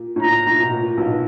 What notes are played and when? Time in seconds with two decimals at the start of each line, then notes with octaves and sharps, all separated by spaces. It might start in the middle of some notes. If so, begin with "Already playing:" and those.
Already playing: A#2
0.16 A2
0.21 A#2 A#5
0.47 A2
0.60 B2
0.71 A#2
0.97 B1 B2